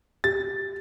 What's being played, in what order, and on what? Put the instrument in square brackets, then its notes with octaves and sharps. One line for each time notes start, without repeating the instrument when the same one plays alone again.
[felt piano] G4 [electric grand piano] A6